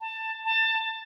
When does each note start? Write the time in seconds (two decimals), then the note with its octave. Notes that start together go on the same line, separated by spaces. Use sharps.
0.01 A5
0.45 A5